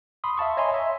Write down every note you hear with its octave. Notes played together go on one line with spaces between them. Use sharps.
B5 C6 D#6
E5 F5 A5 C#6
C#5 D#5 E5 G#5 A#5 C6
E5